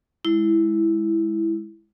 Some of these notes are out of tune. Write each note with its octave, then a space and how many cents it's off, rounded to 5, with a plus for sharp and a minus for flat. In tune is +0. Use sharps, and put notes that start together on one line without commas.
G#3 +0 E4 +0